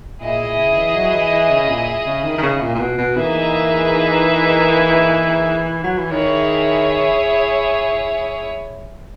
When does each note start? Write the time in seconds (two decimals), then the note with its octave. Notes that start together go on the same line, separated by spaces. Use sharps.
0.21 A#2 E4 G#4 D#5
0.40 A#2
0.58 C#3
0.77 E3
0.95 F#3
1.14 E3
1.32 E3
1.51 C#3
1.69 A#2
2.06 C#3
2.24 D#3
2.38 D#3
2.43 C#3
2.61 A#2
2.75 A#2
2.79 B2
2.98 B2
3.16 E3 A#3 D#4 G#4 B4 E5
5.84 F#3
5.98 E3
6.11 D#3 E4 G#4 C#5